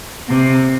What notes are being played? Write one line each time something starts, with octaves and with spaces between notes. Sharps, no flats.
C3